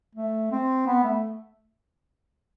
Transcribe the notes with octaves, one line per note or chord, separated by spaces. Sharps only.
A3
C4
B3
A3